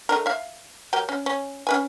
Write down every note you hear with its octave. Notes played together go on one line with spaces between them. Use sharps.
A3 D4 A#4
E5 F5
F#3 G4 A#4
C#4
C#4
C#4 B4 G#5